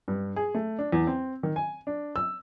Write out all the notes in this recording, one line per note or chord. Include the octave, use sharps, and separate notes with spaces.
G2
G#4
A3
D4
E2
C4
D#3
G#5
D4
E6